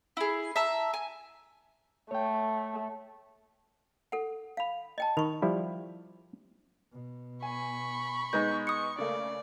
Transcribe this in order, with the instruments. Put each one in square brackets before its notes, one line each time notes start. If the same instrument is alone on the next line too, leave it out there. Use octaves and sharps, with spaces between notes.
[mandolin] E4 G#4
E5 A5 A#5
G#5
[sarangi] A3 [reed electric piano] C#5 G5
[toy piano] A4 F#5
F5 B5
D#5 G5 A5
[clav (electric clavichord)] D#3 [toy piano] B5 C#6
[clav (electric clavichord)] F3 G3 E4
[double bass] B2
[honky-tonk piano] G#5 [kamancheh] B5 C#6
[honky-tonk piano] G#3 B3 D#4 [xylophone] G6
[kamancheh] C#6 [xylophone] D#6 C#7
[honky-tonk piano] C#3 A3 A#3 [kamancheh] D5